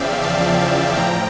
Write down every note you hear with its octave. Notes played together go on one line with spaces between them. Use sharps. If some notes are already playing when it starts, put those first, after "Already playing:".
Already playing: E2 C#3 F3 D5 E5 F5 G5
F5 A5
A2 F3 G5 A#5